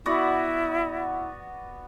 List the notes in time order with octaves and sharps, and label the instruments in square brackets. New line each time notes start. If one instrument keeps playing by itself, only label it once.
[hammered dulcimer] B3 F#4 D5 [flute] E4